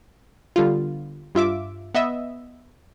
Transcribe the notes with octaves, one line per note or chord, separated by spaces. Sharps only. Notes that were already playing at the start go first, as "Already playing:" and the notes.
D3 G3 B3 F4
G2 F4 E5 D6
B3 D#5 E5